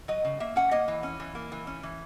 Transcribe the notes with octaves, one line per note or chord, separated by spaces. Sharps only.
F#3 D#5
C#3
A#3 E5
C#4 F#5
A#3 D#5
E3
C#4
E3
A#3
E3
C#4
E3